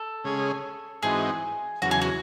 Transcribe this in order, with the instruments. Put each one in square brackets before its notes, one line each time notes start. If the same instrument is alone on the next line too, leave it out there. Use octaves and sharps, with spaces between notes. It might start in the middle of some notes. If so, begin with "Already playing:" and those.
Already playing: [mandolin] A4
[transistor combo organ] C#3 G#3 C#4 G#4
[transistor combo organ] G#2 E3 C4 D#4 F#4 [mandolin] G#4
[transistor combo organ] E2 C#3 F#3 [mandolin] F#4
[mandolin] G#4
F#4